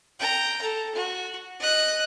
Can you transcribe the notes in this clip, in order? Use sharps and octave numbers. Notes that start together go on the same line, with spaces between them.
G5 A#5
A4
F#4
D#5 F#6